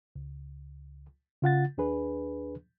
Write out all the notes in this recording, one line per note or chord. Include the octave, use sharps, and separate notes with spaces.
C#2
C#3 F4 F#5 A6
D#2 D4 G#4 B4